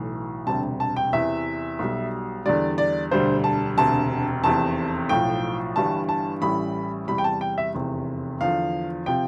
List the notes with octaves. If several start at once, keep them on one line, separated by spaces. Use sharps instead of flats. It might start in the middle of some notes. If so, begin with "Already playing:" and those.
Already playing: B1 A2 E3
E1 D2 C3 G3 A5
A5
G5
E2 C3 E3 E5
B1 B2 G3
E2 D3 G3 D5
D5
E1 D2 D3 G3 C5
A5
E1 D2 C3 A5
F1 E2 C3 A5
B1 A2 F3 G5
G1 G2 E3 G3 A5
A5
A1 A2 E3 G3 B5
E2 C3 G3 B5
G5
A5
G5
E5
F1 E2 C3
E2 D3 F3 F5
C3 F3 G5